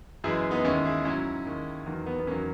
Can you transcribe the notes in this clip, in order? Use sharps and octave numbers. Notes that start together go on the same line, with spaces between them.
F#2 E3 G#3 E4 G#4
B3 D#4
D#2 D#3 G#3 C#4 E4
E4 G#4
G#2 F#3 C#4 E4
D#2 D#3 G#3
E2 D#3 F#3 A#3
B3
B3
E2 D#3 F#3 A#3 C#4